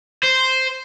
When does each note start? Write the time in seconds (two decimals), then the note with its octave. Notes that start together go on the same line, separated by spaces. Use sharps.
0.24 C5